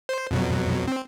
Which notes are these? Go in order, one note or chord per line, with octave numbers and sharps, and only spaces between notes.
C5
F2 B2 F#3
C4